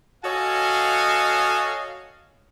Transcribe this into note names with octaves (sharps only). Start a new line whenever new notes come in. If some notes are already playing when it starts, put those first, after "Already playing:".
F#4 A4 C#5 D#5 F5 G#5